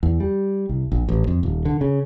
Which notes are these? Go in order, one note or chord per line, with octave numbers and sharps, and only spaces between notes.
E2
G3
C2
A#1
A1
F2
D#1
D3
C#3